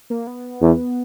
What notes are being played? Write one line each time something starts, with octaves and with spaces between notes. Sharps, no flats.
A#3
B3
E2